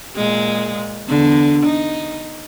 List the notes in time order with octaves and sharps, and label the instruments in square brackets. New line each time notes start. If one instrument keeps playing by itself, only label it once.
[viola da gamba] A#2 G#3
E2 D3
D#4